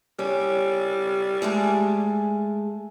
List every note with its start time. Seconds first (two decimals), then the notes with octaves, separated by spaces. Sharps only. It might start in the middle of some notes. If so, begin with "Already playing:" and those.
0.19 G3 C#4
1.42 G#3 A3 G#4